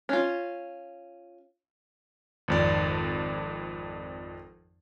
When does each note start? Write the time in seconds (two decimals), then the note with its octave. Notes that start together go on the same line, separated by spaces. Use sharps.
0.09 C#4 F4
2.48 G#1 F2 D5